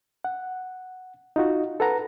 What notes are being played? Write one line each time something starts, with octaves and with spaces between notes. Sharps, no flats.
F#5
D#4 F4 F#4
A4 B4 F#5 A#5